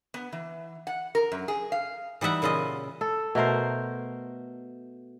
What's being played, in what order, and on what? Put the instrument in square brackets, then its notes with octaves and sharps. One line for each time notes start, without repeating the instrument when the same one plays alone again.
[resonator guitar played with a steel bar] B3
E3
F#5
A#4
F#2
G#4
F5
[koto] E3 G3 D#4 E5 F#5
A#2 C#3 E4 F4 D#5
[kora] A4
B2 A3 A#4 C5